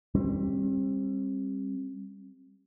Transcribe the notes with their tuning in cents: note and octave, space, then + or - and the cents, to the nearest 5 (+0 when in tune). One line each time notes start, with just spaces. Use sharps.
G3 +15 C4 +40